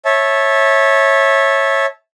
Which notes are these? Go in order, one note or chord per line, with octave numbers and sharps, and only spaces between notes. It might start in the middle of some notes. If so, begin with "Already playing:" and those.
C#5 E5 A5